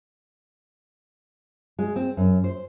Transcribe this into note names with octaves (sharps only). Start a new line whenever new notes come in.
G#3
C4
F#2
C5